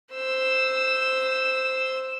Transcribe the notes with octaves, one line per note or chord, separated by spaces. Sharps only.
C5 E6